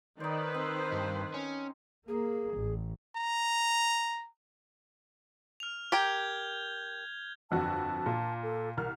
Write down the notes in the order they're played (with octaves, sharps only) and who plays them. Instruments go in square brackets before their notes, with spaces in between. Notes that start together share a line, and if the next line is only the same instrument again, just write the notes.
[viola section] D#3 B4 [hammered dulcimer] D#4 C5 [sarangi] D5
[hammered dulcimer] C4 [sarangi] C5
[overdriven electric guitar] G2
C#4
[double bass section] A#3 [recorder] G#4
[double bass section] A1
[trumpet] A#5
[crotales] F6 F7
[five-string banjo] G4 A#4 G5 [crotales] G6 G#6 G7
[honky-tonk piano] G1 F2 F#4 [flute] A5
[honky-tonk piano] A#2
[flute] A4
[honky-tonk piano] C2 F6 [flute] A#4